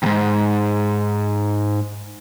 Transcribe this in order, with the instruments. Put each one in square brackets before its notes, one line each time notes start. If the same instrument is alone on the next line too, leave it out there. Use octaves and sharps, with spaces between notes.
[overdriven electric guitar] D#2 G#2